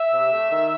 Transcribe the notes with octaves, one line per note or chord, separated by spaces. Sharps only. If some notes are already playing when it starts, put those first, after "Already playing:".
Already playing: E5
C3
A3
D#3